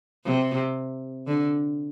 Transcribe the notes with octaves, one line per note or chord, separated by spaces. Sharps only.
C3
D3